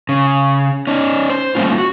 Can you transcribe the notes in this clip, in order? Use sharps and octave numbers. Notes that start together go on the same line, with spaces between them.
C#3
C#4 D#4
C5
G3 A3 A#3 C#4 F4
F#4